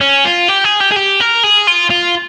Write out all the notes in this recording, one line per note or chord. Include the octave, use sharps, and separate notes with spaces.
C#4
F4
G4
G#4
G4
G#4
G4
A#4
G#4
F4
F4